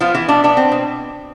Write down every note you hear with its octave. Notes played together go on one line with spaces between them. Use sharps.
F3 B3 F4
E3 B3 E4
B2 D4
B3 D4
C4
B2